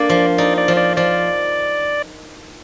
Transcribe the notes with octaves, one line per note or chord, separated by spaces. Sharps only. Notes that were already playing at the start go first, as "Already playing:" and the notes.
Already playing: A#3 D4 D5
F3
D#4 D5
D5
F3
D5
F3 D5